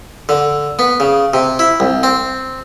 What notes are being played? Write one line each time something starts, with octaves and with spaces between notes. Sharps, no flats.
D3
B3
C#3
C3
E4
C2
C4